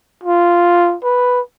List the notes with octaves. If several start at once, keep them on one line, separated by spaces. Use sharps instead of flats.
F4
B4